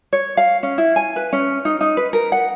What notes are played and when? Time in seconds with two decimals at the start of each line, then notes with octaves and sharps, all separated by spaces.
0.13 C#5
0.37 F5
0.63 C#4
0.78 E4
0.96 G#5
1.16 B4
1.33 C#4
1.65 D#4
1.81 D#4
1.97 B4
2.13 A#4
2.32 F#5